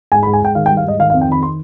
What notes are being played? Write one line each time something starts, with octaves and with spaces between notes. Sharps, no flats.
G#2 G#5
B5
G#2
G#5
G#2 G5
D#3 F5
G5
G3
F5
G#2 D#5
D#3 F5
F5
F2
G5
D#3 B5
C6